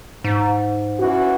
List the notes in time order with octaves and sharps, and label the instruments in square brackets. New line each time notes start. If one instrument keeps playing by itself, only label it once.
[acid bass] G#2
[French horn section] E3 C#4 F#4